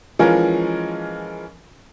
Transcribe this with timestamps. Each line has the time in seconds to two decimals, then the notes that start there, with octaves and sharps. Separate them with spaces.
0.19 E3 F3 G#3 C#4 F4 A#4